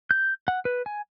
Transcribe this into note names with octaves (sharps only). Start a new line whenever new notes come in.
G6
F#5
B4
G#5